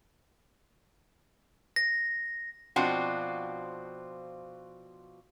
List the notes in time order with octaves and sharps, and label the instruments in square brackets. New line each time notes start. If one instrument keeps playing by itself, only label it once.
[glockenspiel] A#6
[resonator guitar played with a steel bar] B2 F3 C4 D4 F4 F#4